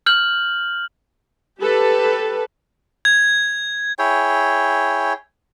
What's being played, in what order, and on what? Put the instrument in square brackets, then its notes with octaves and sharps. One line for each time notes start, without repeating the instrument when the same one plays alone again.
[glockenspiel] F6 G6 F#7
[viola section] G4 A4 B4
[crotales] G#6
[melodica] E4 G#4 C#5 G5